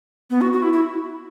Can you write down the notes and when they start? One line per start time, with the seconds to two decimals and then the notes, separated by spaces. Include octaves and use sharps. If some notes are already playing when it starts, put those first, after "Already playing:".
0.30 B3
0.41 F#4
0.52 F#4
0.62 E4
0.73 E4